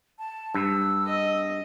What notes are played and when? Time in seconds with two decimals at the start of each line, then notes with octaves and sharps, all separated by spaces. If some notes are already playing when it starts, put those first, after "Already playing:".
0.19 A5
0.54 G2 E6
1.07 D#5